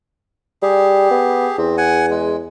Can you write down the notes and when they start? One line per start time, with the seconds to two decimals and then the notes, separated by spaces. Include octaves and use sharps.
0.62 G3 G4 G#4
1.11 B3
1.58 E2 C4
1.78 F#5 G#5
2.10 G#3